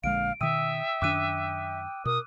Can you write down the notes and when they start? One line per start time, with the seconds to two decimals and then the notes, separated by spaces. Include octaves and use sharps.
0.04 A#1 D3 G#3 F5 D7
0.41 B2 D#3 E5 G5 D#6 E6 D#7
1.02 F#2 D#3 D4 D6 F#6 D#7
2.05 B2 A#4 D#6